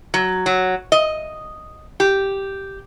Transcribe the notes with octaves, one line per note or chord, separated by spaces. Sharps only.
F#3
F#3
D#5
G4